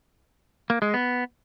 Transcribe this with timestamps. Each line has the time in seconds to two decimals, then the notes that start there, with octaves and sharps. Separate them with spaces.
0.70 A#3
0.82 G#3
0.94 B3